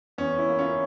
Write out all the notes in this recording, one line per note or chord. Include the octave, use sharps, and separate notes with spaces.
E2 C#4
E4
A#3
C#4 F4